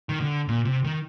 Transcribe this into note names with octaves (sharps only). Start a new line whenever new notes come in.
D#3
D3
A#2
C3
D#3